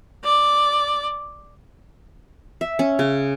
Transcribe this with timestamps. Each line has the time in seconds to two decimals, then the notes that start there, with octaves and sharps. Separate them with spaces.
0.24 D5
2.61 E5
2.79 C#4
2.99 C#3